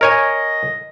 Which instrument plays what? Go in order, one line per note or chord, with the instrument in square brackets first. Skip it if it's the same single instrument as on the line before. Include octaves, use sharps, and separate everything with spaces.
[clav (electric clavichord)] A#4 C#5 G#5 [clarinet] D#5